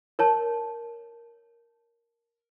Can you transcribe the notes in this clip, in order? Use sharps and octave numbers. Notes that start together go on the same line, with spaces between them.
A#4 C#5 A5